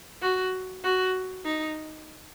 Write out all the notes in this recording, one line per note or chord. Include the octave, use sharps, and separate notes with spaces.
F#4
F#4
D#4